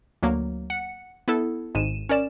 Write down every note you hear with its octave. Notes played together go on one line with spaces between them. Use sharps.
D2 F#3 A#3
F#5 C#7
B3 E4 A4
G#1 G#2 D#7 E7
C#4 A#4 D5 E7